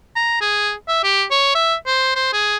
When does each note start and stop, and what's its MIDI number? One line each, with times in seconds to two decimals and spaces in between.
0.16 0.39 82
0.41 0.73 68
0.88 1.00 76
1.03 1.24 67
1.31 1.51 73
1.55 1.75 76
1.86 2.13 72
2.15 2.32 72
2.33 2.57 68